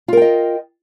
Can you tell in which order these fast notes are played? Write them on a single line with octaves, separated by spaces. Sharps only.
F4 A#4 G5 D#5